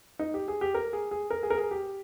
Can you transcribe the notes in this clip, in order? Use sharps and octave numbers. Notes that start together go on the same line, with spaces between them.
D#4
G4
G#4
G4
A#4
G#4
G#4
A#4
G#4
A#4
G#4
G4